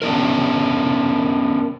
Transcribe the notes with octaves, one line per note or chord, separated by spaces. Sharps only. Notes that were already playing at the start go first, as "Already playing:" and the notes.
B3 C#4 D4 A#4